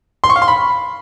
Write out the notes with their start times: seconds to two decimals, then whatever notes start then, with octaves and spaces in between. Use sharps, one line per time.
0.24 C6
0.30 C#6
0.36 F5
0.42 C6
0.48 B5